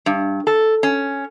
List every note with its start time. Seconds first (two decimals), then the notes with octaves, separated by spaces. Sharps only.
0.06 G2
0.47 A4
0.83 C#4